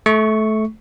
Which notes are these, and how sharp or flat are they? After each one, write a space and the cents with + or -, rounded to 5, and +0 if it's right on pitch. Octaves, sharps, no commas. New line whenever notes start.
A3 -20 C#6 +0